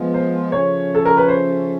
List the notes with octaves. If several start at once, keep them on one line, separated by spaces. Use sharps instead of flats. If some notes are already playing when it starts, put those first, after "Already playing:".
Already playing: F3 G#3 B3
C5
C#3 F3 A3 C#4 C#5
A4
A#4
B4
C5